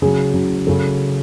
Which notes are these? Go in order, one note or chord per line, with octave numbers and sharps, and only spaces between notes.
C#3 F#3 G#4
C#3 F#3
C#3 F#3 A4